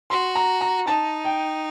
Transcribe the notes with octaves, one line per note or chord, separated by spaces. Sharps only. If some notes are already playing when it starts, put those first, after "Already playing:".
F#4 C6
A#5
A#5
D#4 A5
G5